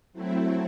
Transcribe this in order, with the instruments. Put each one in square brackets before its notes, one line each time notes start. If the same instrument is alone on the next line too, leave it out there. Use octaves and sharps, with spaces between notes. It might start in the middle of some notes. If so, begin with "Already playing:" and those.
[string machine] F#3 A3 C4 E4